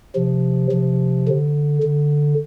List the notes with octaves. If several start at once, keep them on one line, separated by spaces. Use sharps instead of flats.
C3 F3
C3 F3
D3
D3